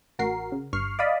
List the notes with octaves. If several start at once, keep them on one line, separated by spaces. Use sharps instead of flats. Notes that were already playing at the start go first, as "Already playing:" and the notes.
A1 F#4 A#4 C7
C#3
G1 G2 C#6 F6 C7
D5 D#5 F5 B5 D#6